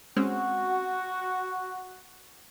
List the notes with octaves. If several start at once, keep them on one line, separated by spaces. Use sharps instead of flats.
G#3 C4 C#4 F#4